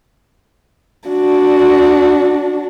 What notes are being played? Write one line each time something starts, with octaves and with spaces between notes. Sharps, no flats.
D4 F#4